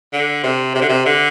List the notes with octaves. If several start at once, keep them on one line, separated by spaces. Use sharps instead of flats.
D3
C3
C3
D3
C3
D3